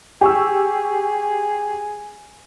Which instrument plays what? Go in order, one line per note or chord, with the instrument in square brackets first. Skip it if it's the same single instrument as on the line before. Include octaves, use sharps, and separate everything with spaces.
[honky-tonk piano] G4 C#6 E6 [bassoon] G#4